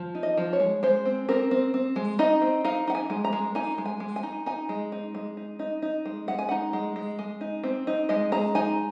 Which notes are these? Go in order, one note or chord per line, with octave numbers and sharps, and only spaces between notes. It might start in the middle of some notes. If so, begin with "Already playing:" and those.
Already playing: F3
D#4
D#5
F3
C#5
G#3
G#3 C5
C4
C4 A#4
C4
C4
G#3
D#4 D#5
C4
D#4 F5
D#4 F#5
G#5
G#3
A#5
G#3
D#4 G#5
G#3
G#5
G#3
G#5
D#4
D#4 G#5
G#3
D#4
G#3
D#4
D#4
D#4
G#3
G#3 F#5
G#5
D#4 F#5
G#3
G#3
G#3
D#4
C4
D#4
G#3 D#5
G#3 A#5
D#4 G#5